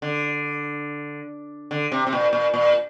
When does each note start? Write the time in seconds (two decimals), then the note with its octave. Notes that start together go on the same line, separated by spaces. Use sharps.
0.02 D3
1.71 D3
1.92 C3
2.07 C3
2.13 A#2
2.33 A#2
2.54 A#2